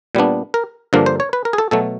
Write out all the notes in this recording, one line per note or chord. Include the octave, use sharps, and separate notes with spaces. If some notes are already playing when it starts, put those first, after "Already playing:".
A#2 G3 B3 D4
A#4
G2 D3 F3 A#3 D4 A#4
C5
C#5
B4
A#4
G#4
A4
B2 F#3 A3 A4